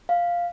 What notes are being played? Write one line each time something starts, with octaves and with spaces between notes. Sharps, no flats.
F5